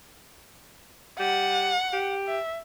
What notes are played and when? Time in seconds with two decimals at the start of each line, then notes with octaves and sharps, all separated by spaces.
1.19 G3 F#5
1.93 G4
2.27 E5